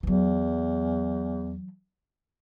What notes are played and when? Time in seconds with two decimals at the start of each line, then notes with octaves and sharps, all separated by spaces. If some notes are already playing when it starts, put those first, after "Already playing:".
0.03 E2 E3 F#3